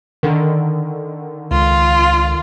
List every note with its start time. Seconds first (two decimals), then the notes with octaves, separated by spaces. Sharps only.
0.23 D3 D#3
1.51 C#2 F4